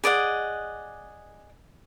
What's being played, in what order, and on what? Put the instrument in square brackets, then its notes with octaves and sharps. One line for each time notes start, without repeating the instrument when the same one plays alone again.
[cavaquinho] G#4 D5 D#5 F#5